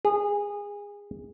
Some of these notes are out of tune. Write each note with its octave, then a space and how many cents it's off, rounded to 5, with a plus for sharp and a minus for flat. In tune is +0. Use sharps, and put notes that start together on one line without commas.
G#4 -25